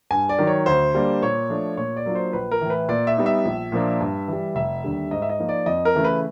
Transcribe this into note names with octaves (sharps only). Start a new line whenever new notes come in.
G2 G#5
D5
D#3 F#3
C#5
D2 C5
D3 G3 A#3 D4
A#2 C#5
F3 A3 D4 F4
A#2 C#5
D5
F#3 A#3 D4 F4
C5
A#1 B4
A#4
A2 E3
B4
A#2 D5
E5
G3 B3 D#4
E5
A#1
A#2 F3 A#3 D4
G2
E3 G3
F1 E5
D#2 D3 G3
G#2 D#5
E5
D#5
F3 A#3 D#4
D5
F2 D#5
A#4
C#3 E3 A3
B4